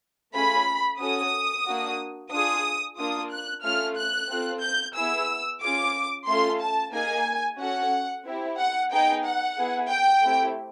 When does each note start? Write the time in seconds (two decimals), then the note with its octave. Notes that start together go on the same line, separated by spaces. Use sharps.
0.34 A3 C#4 F4 G#4 B5
0.99 C#4 F#4 A4 D#6
1.66 A#3 D4 F#4
2.32 D4 F4 G#4 D#6
2.98 A#3 D4 F4 D#6
3.31 F#6
3.63 A3 C#4 F4 A4 F6
3.97 F#6
4.29 C4 F4 A4
4.63 G6
4.95 B3 E4 G#4 E6
5.61 C#4 F4 G#4 D6
6.27 A3 C#4 F4 A4 C6
6.61 A5
6.93 A#3 D#4 G#4 G#5
7.59 C#4 F#4 A4 F#5
8.25 C4 E4 G4
8.58 F#5
8.91 B3 D#4 G#4 G5
9.24 F#5
9.57 B3 E4 G#4
9.89 G5
10.23 A3 C4 E4 G4